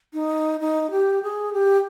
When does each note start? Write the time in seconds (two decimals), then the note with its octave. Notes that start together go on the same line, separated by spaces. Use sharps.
0.14 D#4
0.60 D#4
0.91 G4
1.23 G#4
1.53 G4